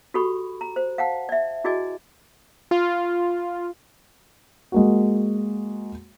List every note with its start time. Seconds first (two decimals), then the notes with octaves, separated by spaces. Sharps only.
0.14 F#4 G4 A4 B5 C#6
0.61 A#5
0.76 C5
0.98 F5 F#5 A5
1.29 D5 E5
1.64 E4 F#4 G#4 D5 D#5 G#5
2.71 F4
4.72 G#3 A#3 F#4